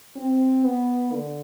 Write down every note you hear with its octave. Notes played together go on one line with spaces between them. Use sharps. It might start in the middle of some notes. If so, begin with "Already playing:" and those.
C4
B3
D3